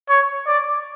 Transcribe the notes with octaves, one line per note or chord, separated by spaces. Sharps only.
C#5
D5